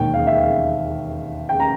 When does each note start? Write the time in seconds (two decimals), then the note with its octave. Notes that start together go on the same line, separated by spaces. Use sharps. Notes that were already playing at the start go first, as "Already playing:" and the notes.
Already playing: E1 D#2 D#3 G5
0.14 F5
0.27 E5
0.41 F5
1.49 G5
1.60 A#5